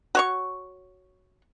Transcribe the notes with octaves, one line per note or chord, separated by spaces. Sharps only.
F#4 C#5 C#6